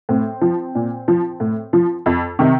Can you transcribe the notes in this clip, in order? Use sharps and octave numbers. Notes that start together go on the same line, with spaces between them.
A2 C4
F3
A#2
F3
A2
F3
F2
C3 D#3